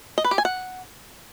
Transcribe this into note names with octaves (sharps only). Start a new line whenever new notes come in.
D#5
B4
G4
G#5
F#5